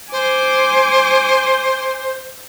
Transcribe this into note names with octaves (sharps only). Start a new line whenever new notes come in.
C5 G#5 D6